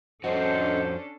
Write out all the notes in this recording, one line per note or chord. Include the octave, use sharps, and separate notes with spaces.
F2 C#4 D4 F#4 A4 C5 D#5